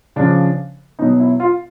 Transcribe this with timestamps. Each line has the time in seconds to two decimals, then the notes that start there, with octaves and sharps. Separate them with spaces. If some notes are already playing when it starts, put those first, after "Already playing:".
0.16 C#3 F3 D4
0.99 B2 F#3 D#4
1.20 E4
1.40 F4